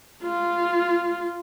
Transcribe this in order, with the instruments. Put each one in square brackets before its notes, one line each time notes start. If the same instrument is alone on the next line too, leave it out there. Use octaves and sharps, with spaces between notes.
[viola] F4